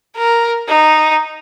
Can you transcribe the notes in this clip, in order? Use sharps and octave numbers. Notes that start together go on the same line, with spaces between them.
A#4
D#4